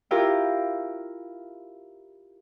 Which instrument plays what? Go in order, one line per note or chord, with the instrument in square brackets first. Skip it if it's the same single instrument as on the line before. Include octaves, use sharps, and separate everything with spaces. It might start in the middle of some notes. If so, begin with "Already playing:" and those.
[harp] E4 F4 G4 A#4